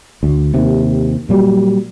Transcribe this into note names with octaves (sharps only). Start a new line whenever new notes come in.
D2
D#2 C3
A#2 F#3 G3